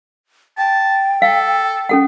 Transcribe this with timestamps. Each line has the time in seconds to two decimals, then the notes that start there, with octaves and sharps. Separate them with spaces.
0.58 G5 A5
1.22 A4 F5
1.89 C#4 A4 F#5